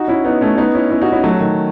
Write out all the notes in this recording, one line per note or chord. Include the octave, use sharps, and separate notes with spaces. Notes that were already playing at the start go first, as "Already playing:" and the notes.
Already playing: D#4 F#4
C#4 E4
B3 D#4
A3 C#4
B3 D#4
C#4 E4
C#4 E4
D#4 F#4
C#4 E4
F#3 A3
D#3